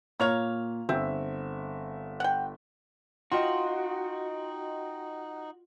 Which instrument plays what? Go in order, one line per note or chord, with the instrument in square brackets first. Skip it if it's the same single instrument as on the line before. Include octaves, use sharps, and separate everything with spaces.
[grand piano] A#2 F7 [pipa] A#3 C#5 F5
[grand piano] G1 E5 [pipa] C4
[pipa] F#5 G5
[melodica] D#4 [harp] F4 [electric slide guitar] F#4 [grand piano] D#5 G5 C6